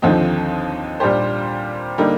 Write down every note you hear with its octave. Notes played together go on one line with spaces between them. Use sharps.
D#2 D3 F3 C4 D#4
A#2 G3 D4 G4 C5
D3 G3 A#3 D#4